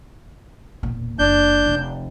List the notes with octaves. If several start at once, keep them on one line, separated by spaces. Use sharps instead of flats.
E1 A#2
F#1 D4 G6
F1